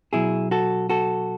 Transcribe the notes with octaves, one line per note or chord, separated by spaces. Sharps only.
B2 F#3 E4 G#4
F#4 A4
F#4 A4